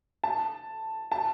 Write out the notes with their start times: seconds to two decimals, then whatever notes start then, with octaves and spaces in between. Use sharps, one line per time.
0.24 A5
1.12 A5